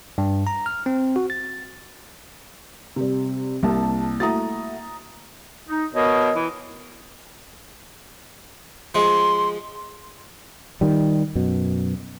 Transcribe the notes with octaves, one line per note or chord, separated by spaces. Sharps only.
G2
A#5
F6
C4
F#4
A6
C3 G3
C2 G3 A#3 C4 G4 A5
A3 E4 F#4 A#5 D#6 A6
D#4
B2 A#4 C#5 D#5
E3
F3 G#3 C6
D#3 G3
F#2 B2